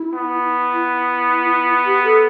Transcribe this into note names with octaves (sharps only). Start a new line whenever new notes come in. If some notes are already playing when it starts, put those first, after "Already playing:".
Already playing: E4
B3
E4
G4
A4